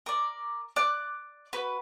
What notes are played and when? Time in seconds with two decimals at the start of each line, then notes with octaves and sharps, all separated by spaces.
0.06 A#4 D5
0.76 D5 F#6
1.53 F#4 B4